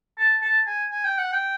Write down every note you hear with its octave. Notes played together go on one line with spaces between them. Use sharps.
A5
A5
G#5
G#5
G5
F#5
G5